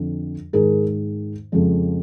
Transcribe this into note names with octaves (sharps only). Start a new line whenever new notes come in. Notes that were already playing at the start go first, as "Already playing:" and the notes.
Already playing: F2 D3 F3
G#2 D#3 G#3 G#4 A#4
F2 C#3 F3 G#3